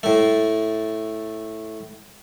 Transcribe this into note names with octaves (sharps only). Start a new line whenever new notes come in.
A2 A3